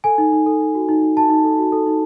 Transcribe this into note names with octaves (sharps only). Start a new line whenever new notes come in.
A4 G#5
D#4
D#4
A4
D#4
F#4
D#4
D#4
F#4 A5
D#4
A4
F#4
A4
D#4